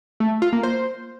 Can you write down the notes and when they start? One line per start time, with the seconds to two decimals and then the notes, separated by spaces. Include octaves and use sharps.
0.20 A3
0.31 A3
0.42 F4
0.53 A#3
0.63 C5